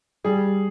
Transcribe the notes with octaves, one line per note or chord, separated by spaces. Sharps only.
G3 G#4